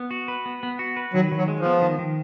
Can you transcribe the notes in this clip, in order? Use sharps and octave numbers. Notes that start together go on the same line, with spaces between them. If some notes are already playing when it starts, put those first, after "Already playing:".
Already playing: B3
F#4
B4
B3
B3
F#4
B4
D#3 F#3
D#3
F#3
G#3
F3
B3
D#3
D#3